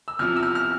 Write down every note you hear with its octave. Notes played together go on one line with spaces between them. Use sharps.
E6
E2 C3 F3 F6
E6
F6
F6